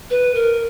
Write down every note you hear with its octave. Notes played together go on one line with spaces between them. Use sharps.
B4
A#4